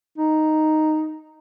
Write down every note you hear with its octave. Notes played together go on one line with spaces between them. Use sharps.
D#4